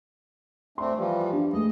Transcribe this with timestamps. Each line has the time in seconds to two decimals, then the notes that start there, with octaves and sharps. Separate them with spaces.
0.78 A3 C4 D4 C6
0.96 E3 F3 G3
1.33 D4
1.53 G#3 A3 D#5